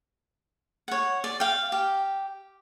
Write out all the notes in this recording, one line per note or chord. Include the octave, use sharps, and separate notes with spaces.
C#5 F#5
D5
F5 G5
G4